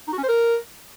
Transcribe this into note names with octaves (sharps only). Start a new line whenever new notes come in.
D#4
F#4
C#4
C5
A#4